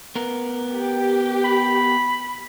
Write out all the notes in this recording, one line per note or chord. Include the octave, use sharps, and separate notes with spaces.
B3 A#4
G4
B5